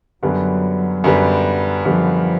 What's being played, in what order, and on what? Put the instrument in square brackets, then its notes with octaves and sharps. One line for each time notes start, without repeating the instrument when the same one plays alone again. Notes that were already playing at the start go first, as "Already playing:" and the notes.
[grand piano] F#2 D3 G3 B3 [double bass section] F#3
[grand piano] F#2 D3 G3 B3
[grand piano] F#2 D3 G3 B3 [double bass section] F3